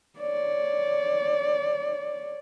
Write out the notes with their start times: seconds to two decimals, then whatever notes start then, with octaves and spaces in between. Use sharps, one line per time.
0.19 C#5 D5